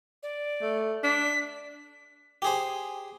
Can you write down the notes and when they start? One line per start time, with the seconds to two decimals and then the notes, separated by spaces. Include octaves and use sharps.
0.23 D5
0.62 A3
1.03 D4 B6
2.42 G4 G#4 C5